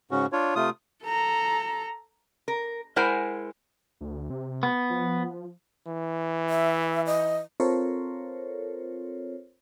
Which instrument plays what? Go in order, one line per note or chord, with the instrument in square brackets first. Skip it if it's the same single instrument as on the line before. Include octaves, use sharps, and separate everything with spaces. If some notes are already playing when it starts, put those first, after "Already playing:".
[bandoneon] G#2 C#3 C#4 F#4
D4 F4 C#5
C3 A3 F4 D#6
[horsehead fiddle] A4 A#5
[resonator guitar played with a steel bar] A#4
G#3 E4 A#4 C5 F#5 G#5
[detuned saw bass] D2
C3
[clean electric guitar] B3
[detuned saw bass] F3
[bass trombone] E3
[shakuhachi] E5
D#5
[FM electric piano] C4 F4 A4 A#4 C5 C#5